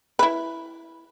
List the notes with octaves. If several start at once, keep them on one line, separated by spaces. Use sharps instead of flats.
E4 B4